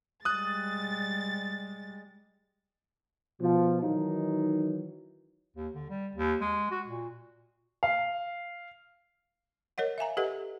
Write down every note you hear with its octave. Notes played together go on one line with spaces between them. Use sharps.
G3 G#3 D#6 F#6 A6
B2 F3
D#3 E3 F#3 D#4
D#2
D3
G3
D#2
G#3
F#4
A#2
F5
A#4 C#5 D#5 F#5
E5 F5 G#5 A#5
G4 A4 B4 D#5 F#5